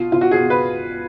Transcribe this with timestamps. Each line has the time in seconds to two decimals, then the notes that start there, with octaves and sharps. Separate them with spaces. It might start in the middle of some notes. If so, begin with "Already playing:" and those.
Already playing: B2 F4
0.12 B2 F4
0.21 F#4
0.31 G#4
0.41 B2
0.50 B4